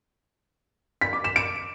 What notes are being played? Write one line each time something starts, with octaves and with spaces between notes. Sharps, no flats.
B6
D6
E7
D7